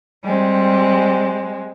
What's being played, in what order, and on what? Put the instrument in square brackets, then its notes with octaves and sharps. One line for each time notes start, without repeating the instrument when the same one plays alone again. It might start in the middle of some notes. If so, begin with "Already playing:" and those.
[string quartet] G3 G#3 C4